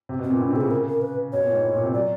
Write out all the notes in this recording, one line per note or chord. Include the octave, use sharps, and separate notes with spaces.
C3
B2
C4
A#2
A2 C#4
C3 D4
A4
C#3 G#4
A#4
A#4
B4
B2 C#5
A#2
G#2
A2
A#2
C3
F#3 D5